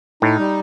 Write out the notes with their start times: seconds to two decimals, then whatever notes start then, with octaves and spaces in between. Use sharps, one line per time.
0.22 A2 D#4
0.39 G3